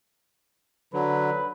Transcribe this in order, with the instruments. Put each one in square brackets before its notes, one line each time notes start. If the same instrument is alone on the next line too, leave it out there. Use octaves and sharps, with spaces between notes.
[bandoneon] D3 F#3 [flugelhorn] B4